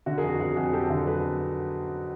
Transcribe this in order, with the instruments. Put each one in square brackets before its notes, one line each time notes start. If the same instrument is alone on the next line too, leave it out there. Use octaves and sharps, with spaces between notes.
[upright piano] D3 F#4
G#4 A#4
F2
F#4
F2 F#4 G#4
F2 F#4 G#4
F#3 G4 A4
D3 G4 A4
F#3 A4 B4